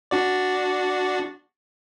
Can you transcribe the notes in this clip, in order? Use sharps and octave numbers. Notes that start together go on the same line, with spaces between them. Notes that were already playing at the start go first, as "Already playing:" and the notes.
D4 F#4 D5